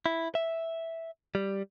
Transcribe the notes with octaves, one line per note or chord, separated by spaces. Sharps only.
E4
E5
G3